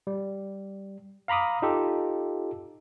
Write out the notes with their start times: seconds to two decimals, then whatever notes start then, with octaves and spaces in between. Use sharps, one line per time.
0.07 G3
1.28 F5 A#5 B5 D6 D#6
1.62 D#4 F4 G4 A4